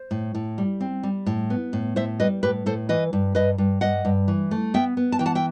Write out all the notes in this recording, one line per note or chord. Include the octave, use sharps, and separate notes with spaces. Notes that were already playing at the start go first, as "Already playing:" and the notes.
Already playing: C5
A2
A2
G3
C4
G3
A2
B3
A2
A2 C5 E5
G3 B4 D#5
A2 G4 B4
A2 A4 C5
E3 B4 D#5
G2
G2 B4 D#5
G2
G2 D#5 F#5
G2
E3
A3
B3 E5 G5
B3
A5
E3 G5
F#5 A5
E5 G5